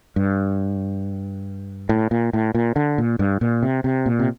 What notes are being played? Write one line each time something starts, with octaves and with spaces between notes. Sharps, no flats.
G2
A2
A#2
A2
A#2
D3
A#2
G2
A#2
C3
C3
A#2
C3